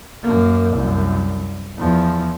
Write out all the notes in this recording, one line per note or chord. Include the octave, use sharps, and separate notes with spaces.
F#2 A#3
C2 F#2
E2 F3